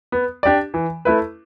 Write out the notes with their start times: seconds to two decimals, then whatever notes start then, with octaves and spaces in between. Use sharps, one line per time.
0.12 B3
0.43 D4 G4 D5
0.74 E3
1.05 A3 E4 B4